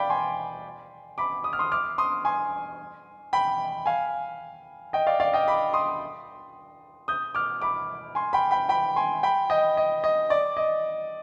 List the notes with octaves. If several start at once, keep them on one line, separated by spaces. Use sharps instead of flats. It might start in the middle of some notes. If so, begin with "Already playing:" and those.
Already playing: D5 F5 G5 B5
G#5 C6
B5 D6
D#6
F6
C6 D#6
D6 F6
C6 D#6
G#5 C6
G5 B5
F5 G#5
D#5 G5
D5 F5
D5 F5
D#5 G5
B5 D6
C6 D#6
D#6 G6
D6 F6
B5 D6
G#5 C6
G5 B5
G5 B5
G5 B5
G#5 C6
G5 B5
D#5 G5
D#5
D#5
D5
D#5